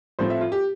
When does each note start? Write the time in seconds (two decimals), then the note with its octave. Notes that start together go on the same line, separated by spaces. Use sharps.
0.19 A2 F3 A3 C4 C5
0.30 E5
0.41 F4
0.52 G4